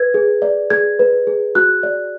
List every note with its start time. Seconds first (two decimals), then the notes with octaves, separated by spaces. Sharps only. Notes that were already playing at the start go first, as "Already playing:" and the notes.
Already playing: B4 G#6
0.14 G#4
0.42 D5
0.70 G#4 G#6
0.99 B4
1.27 G#4
1.55 F#4 F#6
1.83 D5